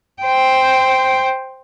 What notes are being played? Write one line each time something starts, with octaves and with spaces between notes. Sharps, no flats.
C5 G5